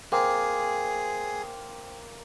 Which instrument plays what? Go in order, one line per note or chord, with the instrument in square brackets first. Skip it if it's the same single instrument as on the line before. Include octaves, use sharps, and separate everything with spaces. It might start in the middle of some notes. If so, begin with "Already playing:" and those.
[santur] A#3 [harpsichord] C4 [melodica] G#4